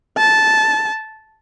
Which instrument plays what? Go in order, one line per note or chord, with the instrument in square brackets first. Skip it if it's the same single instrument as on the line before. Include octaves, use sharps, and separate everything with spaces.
[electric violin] A5